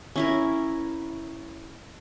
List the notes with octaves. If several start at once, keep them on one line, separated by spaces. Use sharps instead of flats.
C#4 E4 A#4